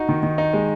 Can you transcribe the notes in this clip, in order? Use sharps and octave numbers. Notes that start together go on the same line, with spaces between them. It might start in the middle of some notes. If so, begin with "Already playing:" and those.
Already playing: D#4 F#4
D#3
D#3
D#4
G#3